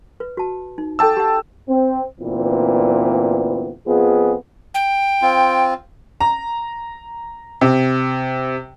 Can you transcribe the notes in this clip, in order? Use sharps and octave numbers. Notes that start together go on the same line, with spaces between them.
B4
F#4 A5
D#4
A4 F#5 G5 A5 D6 E6
G4 F#5
C4
D2 A#2 E3 B3 C4
F2 B3 F4 G#4
G5
C4 F4
A#5
C3